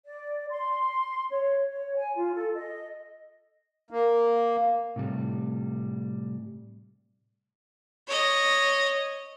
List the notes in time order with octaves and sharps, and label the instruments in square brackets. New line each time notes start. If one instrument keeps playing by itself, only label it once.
[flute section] D5
C6
C#5
C#5
G#5
F4
A4
D#5
[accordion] A#3
[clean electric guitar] A2 C3 G3
[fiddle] C#5 D#5